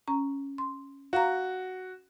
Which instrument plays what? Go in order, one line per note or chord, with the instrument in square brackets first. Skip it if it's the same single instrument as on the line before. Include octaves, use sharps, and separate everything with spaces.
[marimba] C#4 A#5
C6
[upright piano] F#4 [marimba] F5 A#5